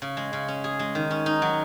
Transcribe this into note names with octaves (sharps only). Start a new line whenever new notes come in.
C#3
G#3
C#3
C#4
G#4
G#3
D#3
C#4
D#4
F#3